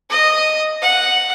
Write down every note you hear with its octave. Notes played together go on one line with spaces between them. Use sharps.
D#5
F#5